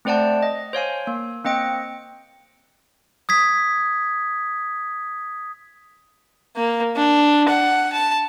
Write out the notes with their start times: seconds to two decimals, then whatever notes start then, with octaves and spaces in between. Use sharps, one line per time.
0.05 A3 C4 C5 D5 F#5 A5
0.43 D#5
0.73 C5 C#5 F5 G#5
1.07 A#3
1.45 A#3 C4 D#5 G5 C#7
3.29 D#6 G#6 B6
6.56 A#3
6.96 D4
7.49 F#5
7.92 A5